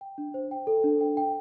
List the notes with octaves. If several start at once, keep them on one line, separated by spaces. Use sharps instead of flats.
G5
D4
C5
G5
A4
D4
G5
G5